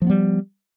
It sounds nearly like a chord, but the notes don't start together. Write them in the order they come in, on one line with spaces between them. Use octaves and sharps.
F3 A#3 B3 G3